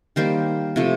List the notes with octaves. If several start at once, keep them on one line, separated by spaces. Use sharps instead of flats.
D#3 G3 A#3 C5
C3 F3 A3